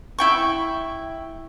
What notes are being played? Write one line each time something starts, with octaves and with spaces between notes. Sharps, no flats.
E4 G5 C#6